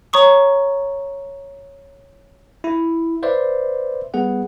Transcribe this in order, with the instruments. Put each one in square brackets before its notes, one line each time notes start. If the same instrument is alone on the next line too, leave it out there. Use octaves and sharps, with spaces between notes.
[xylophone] C#5 A#5 C#6 D#6
[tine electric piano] E4
B4 C5 D5 E5
G3 B3 G#4 F#5